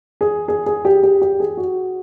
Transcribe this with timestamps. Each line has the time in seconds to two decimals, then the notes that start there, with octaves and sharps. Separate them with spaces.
0.21 G#4
0.48 G#4
0.66 G#4
0.85 G4
1.03 G4
1.22 G4
1.40 G#4
1.57 F#4